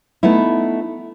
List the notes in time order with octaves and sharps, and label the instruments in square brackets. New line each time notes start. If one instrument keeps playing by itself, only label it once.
[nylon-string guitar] A3 B3 D#4 E4